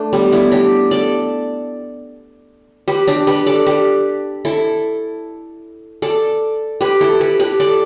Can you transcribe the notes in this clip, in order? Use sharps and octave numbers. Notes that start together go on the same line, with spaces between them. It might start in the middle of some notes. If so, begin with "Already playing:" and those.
Already playing: A3 D4
G3 B3
B3 E4
D4 G4
A4 D5
G4 B4
D4 G4
G4 B4
A4 D5
G4 B4
E4 A4
A4 D5
G4 B4
E4 A4
G4 B4
G4 B4
A4 D5